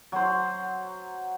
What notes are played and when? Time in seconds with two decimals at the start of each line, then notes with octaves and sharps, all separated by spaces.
0.12 F#3 C5